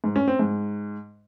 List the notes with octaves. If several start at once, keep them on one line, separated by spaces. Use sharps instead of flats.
G#2
C#4
C4
G#2